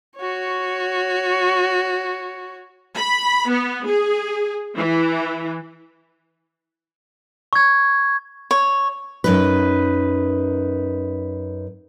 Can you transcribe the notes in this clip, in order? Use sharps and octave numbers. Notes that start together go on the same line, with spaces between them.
F#4 C#5
B5
B3
G#4
E3
C#6 G#6
C#5
F#2 D#4 B4